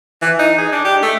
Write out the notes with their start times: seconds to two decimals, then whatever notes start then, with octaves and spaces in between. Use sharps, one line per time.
0.22 E3
0.39 D#4
0.58 G#4
0.72 D4
0.84 G4
1.02 A3